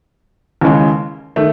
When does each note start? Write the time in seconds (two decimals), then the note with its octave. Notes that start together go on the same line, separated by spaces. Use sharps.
0.61 D#2 C#3 E3 G#3
1.36 D#3 A3